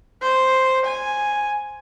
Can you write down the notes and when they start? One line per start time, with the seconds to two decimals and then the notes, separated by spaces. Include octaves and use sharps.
0.22 C5
0.85 G#5